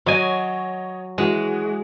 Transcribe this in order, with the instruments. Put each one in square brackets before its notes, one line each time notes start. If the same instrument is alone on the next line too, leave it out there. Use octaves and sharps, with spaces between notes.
[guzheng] F#3 G#5 [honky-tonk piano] C#5 D#5
[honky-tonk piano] E3 F#4 [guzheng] G#3